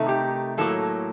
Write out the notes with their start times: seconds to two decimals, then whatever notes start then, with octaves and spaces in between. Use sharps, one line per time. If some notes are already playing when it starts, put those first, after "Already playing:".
Already playing: C3 D#3 A3 D#4
0.08 G4
0.58 A2 F#3 A#3 A4